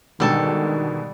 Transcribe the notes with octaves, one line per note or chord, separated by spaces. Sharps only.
G#2 B2 D3 D#3 G3 A4 A5